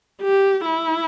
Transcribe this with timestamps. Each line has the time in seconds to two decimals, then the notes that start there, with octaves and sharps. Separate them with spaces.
0.22 G4
0.65 E4